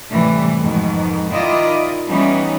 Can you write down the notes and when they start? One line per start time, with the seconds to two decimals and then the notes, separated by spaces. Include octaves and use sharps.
0.11 A2 C3 E3 G3
0.61 F2 G#2 B2 D#3
1.31 D#3 E4 F4 D5 D#5
2.08 E3 G3 B3 C#4 D#4